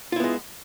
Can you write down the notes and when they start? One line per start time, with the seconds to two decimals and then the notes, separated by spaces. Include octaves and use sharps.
0.12 F4
0.16 E4
0.20 B3
0.24 G#3